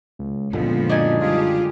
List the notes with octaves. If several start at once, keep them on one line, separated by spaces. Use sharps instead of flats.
C#2
F#1 A#2 D3 F3 G#3 B3 C4
D4 D#4 G#5
G3 F4 G4 G#4